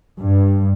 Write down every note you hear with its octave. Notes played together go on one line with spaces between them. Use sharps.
G2